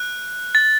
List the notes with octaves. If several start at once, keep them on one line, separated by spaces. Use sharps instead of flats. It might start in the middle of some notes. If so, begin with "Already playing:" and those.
Already playing: F#6
A6